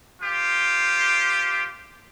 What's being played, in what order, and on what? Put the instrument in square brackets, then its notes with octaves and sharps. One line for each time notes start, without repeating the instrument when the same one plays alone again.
[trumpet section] F4 G4 C5